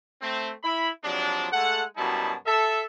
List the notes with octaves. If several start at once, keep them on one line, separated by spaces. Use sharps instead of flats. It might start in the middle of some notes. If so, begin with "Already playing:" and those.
A3 C4
E4 B5
C3 F3 F#3 G#3 D4
G#3 A3 A4 F#5
F#2 B2 G3 D#4 E4 A5
A4 E5